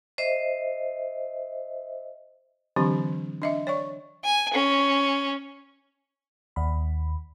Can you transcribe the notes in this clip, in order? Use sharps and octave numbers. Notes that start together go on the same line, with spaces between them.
C5 D#5 E5
D3 E3 F#3 C4 D4 G4
D4 D#5 E5
C#5 D5 C#6
G#5
C#4
D#2 B5